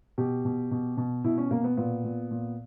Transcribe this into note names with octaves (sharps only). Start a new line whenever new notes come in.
B2 G4
B2
B2
B2
B2 E4
C#4
B2 A#3
B3
A#2 B3
A#2
A#2